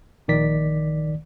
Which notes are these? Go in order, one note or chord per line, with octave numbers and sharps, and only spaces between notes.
A#1 D#3 D5 B6